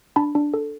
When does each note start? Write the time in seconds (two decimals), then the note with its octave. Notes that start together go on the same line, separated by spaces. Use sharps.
0.16 D4 A5 B5
0.35 D4
0.54 A4